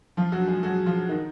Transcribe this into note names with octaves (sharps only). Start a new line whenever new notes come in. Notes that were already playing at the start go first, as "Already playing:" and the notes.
F3 F4
F#3 F#4
G#3 G#4
F#3 F#4
F3 F4
D#3 D#4